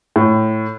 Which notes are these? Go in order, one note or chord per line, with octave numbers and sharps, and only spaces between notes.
A2